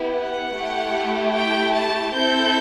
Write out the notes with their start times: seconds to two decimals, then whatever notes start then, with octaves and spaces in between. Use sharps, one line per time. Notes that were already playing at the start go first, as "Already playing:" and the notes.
Already playing: B3 E4 G4
0.15 F#5
0.54 A3 E4 G4
1.34 G5
1.74 A5
2.13 C4 E4 A4 G6